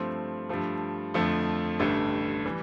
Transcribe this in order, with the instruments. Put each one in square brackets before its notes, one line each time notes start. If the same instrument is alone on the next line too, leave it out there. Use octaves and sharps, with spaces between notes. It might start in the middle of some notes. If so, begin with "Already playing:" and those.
Already playing: [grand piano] G2 F3 A3 C4
G2 F3 A3
F2 D3 F3 A3
A1 G2 D3 A3
E3 G3